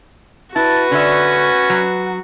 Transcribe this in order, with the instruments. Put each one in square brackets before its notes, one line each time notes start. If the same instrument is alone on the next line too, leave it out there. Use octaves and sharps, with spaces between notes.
[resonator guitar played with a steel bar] E4 [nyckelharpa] F#4 [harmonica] B4 [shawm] A5
[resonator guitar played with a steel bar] D3 E5 [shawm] C#4
[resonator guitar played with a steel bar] F#3